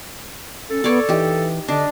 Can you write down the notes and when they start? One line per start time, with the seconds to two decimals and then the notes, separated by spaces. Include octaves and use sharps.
0.70 C#4 A4
0.84 B3 C#5 D5
1.09 E3 D#4 G4
1.68 D3 D4 D#5